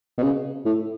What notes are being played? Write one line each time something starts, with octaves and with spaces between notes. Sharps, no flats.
B2
C#3
A2